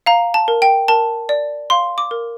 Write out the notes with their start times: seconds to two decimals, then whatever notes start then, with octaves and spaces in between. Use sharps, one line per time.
0.06 F5 A#5
0.34 A5
0.48 A#4
0.62 G5
0.88 A#4 A5
1.29 D5
1.70 F5 C6
1.98 D6
2.11 A#4